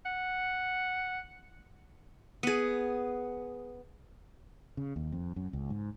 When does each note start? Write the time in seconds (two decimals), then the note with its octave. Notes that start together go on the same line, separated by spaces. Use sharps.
0.05 F#5
2.43 B3 G#4
4.77 C#3
4.96 D#2
5.12 F2
5.36 F#2
5.53 C#2
5.70 G#2